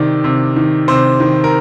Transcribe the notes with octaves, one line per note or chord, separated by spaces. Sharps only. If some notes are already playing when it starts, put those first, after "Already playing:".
Already playing: C3 D#3 D5
C3
D#3
C3 C5
D#3
A#4